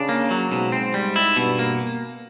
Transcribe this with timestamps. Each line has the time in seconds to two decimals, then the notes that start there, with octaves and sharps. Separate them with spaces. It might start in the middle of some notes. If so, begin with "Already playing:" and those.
Already playing: C#3 D4
0.09 A#3
0.31 F#3
0.52 G#2 B2
0.72 C4
0.94 G3
1.16 E4
1.36 G2 B2
1.59 A#3